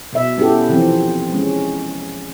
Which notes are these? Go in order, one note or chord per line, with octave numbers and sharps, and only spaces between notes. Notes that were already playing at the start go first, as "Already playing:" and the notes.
B2 E5
B3 C#4 E4 G4 A4
C3 E3 F3 C4
G#3 C#4